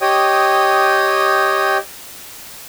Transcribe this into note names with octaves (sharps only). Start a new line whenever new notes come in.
G4 C#5 D#5 G5 D#6